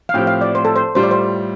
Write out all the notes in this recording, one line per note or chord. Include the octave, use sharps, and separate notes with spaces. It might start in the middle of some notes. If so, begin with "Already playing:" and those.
F5
A2 F3 C4 G4 G5
F5
D5
C5
A4
C5
A2 G3 F4 C5
D5
C5